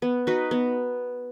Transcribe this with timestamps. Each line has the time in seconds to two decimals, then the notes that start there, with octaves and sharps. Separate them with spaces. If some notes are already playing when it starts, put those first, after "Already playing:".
0.02 B3
0.27 D#4 F#4 B4
0.51 B3